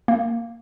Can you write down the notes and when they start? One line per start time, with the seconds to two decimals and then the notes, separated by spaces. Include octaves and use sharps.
0.08 A#3